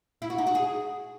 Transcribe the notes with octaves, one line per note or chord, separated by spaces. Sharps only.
E4
F#4
D#4
F#4
G#4